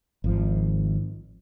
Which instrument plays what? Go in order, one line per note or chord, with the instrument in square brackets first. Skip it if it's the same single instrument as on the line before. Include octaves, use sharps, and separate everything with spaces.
[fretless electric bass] G#1 F3